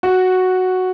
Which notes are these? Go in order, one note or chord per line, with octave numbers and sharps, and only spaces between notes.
F#4